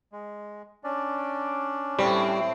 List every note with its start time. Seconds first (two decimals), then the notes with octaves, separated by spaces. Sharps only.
0.12 G#3
0.84 C#4 D4 D5
1.99 A2 G3 C4